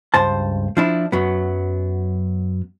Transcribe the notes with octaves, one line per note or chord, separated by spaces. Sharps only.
C#2 G2 C5 A5
F3 D4 E4
F#2 F#3 B3